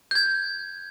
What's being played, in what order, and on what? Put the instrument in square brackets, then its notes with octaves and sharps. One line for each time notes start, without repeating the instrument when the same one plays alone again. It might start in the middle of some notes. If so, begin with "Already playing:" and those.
[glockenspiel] G6 G#6